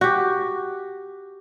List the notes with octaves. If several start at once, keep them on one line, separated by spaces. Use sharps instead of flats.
F#4 G4